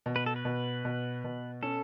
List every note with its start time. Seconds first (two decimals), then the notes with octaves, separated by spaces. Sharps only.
0.06 B2
0.16 B4
0.26 A4
0.36 B4
0.45 B2
0.85 B2
1.24 B2
1.63 C#4 A4